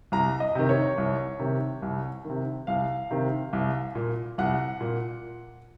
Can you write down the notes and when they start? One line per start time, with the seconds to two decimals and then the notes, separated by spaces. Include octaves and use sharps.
0.12 C2 A#5
0.40 D#5
0.55 C3 D#3
0.69 C#5
0.98 C2
1.39 C3 D#3
1.82 C2
2.25 C3 D#3
2.67 C2 F5
3.11 C3 D#3
3.53 C2
3.95 A#2
4.38 C2 F#5
4.81 A#2